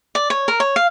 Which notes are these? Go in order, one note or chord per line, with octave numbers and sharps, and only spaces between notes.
D5
C#5
A#4
C#5
F5